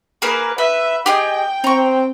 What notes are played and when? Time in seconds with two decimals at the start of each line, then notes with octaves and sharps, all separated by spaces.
0.22 A#3 G#4 A#4 B4
0.58 B4 E5
1.06 G4 G#4 D#5 G5
1.64 C4 A#5 C#6